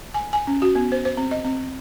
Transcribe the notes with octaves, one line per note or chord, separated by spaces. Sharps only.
G#5
G#5
C#4
F#4
B3
C5
C5
C4
D#5
C4